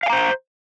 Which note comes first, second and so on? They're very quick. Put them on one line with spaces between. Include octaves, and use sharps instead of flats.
F5 G#5 A#5 C5